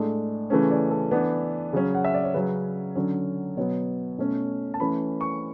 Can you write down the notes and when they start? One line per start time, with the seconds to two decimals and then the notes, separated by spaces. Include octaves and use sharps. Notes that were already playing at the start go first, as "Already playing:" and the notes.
Already playing: A2 G#3 D4 A4
0.50 C#3 E3 A3 C#4
0.71 D5
0.91 A4
1.11 E3 B3 D4
1.73 C#3 F#3 C#4
1.95 F#5
2.05 E5
2.14 D5
2.24 C#5
2.34 C#3 F#3 C#4 B4
2.95 D3 F#3 C#4
3.57 B2 F#3 B3 C#5
4.18 B2 A3 C#4
4.74 A5
4.80 E3 A3 C#4 B5
5.21 C#6